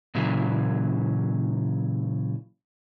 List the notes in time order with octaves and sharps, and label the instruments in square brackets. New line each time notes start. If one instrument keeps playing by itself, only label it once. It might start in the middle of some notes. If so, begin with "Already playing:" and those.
[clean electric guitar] A#2 C#3 E3 F#3